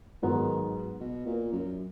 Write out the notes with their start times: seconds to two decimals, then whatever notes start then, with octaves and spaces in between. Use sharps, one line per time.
0.22 G#2 D#3 F#3 B3
1.00 B2
1.26 A#2
1.52 F#2